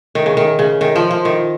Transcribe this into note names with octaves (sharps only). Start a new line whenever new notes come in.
D#3
C#3
D#3
C#3
D#3
F3
F3
D#3